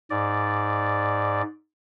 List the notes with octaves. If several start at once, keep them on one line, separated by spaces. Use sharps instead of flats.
G#2 D5